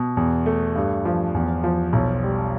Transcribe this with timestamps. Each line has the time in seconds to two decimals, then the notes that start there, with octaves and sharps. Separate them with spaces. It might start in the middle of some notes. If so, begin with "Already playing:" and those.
Already playing: B2
0.17 E2
0.46 A3
0.75 G2
1.05 F3
1.34 E2
1.64 F3
1.93 B1
2.23 G3